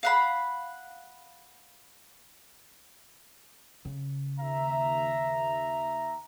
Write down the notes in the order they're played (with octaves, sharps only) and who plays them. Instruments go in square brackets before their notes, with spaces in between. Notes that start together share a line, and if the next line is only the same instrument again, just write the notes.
[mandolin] F5 F#5 B5
[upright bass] C#3
[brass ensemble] D#2 E5 A#5